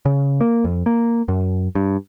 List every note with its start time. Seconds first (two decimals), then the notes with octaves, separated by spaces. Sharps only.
0.06 C#3
0.41 A#3
0.64 F2
0.86 A#3
1.28 F#2
1.75 G2